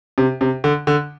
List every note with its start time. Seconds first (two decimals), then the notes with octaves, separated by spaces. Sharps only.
0.18 C3
0.41 C3
0.64 D3
0.87 D3